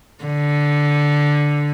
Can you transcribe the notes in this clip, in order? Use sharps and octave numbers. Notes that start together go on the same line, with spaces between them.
D3